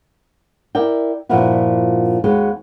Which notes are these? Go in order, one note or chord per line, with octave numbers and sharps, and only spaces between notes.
E4 A#4 D5 G5
G2 A#2 F3 B3 E4 F#4
D#2 G#3 B3 F#4 G5